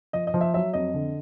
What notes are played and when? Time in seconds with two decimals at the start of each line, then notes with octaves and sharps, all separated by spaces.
0.13 F3 D#5
0.27 D#5
0.34 F3
0.41 E5
0.54 F#3 E5
0.73 F2 D#5
0.94 D3